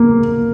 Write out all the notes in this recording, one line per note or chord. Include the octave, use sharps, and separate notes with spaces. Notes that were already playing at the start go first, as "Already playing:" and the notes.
Already playing: A#3